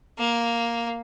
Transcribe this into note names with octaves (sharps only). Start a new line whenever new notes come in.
A#3